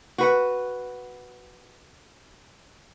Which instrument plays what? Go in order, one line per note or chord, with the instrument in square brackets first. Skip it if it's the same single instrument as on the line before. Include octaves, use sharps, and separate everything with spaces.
[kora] F#4 B4 F#5